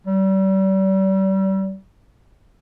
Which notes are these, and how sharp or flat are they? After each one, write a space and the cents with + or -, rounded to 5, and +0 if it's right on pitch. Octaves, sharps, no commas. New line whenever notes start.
G3 -35